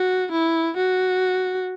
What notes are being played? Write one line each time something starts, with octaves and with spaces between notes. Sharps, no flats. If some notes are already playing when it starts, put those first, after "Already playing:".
Already playing: F#4
E4
F#4